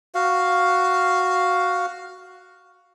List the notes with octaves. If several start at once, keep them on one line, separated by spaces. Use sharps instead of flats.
F#4 F5